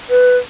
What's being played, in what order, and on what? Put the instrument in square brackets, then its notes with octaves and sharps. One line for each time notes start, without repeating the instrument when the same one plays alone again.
[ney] B4